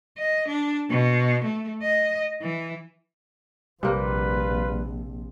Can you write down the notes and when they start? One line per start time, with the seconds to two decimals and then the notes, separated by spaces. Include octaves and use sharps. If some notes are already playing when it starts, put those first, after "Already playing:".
0.18 D#5
0.48 D4
0.90 B2
1.45 A3
1.82 D#5
2.42 E3
3.83 A#1 C3 G3 A#3 F4 B4